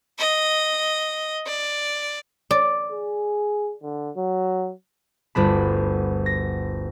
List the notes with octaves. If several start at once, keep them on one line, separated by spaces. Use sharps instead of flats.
D#5
D5
D5
G#4
D3
F#3
G1 D2 D4 B5
A#6